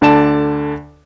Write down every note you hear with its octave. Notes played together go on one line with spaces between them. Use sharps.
D2 D3 D5 A5 E7